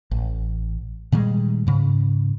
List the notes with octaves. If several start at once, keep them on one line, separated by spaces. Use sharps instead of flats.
A1
A#2 D#3 G3 G#3
G#2 C#3